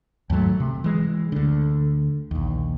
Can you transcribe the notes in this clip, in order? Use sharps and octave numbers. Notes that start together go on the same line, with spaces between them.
D#2 G#2 F#3 A3
C3
E3 G#3
D2 D3
A#1 D#2